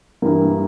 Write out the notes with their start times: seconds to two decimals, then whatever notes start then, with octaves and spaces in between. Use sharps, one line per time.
0.22 G2 E3 G3 A#3